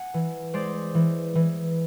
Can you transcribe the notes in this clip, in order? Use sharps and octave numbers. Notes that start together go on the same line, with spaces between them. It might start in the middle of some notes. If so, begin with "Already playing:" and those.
Already playing: F#5 G#5
E3
G#3 C5 D5
E3
E3